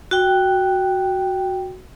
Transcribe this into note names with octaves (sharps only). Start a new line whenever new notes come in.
F#4 G5